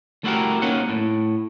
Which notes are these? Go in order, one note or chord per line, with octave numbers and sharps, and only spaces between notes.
A3 E4 F#4 G4 A#4
A#3 C#4 D#4 F#5
A2